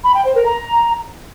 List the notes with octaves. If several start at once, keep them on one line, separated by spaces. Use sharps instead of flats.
B5
G5
C5
A#4
A#5